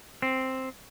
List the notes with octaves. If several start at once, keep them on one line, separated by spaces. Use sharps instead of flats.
C4